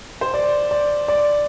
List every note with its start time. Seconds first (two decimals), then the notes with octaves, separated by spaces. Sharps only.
0.21 C5
0.34 D5
0.71 D5
1.08 D5